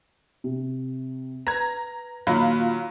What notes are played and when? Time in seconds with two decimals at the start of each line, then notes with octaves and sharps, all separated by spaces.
0.44 C3
1.47 B4 A#5 G#6
2.27 A#2 D#3 F#3 A#3 F4 B5